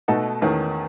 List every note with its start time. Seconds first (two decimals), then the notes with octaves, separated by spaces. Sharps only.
0.08 B2 A3 D#4 F#4 A4
0.42 E2 D#3 A3 C#4